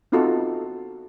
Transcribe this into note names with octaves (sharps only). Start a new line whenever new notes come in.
B3 C4 D#4 F4 F#4 A4